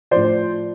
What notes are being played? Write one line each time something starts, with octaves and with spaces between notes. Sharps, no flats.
A2 F3 C5 D5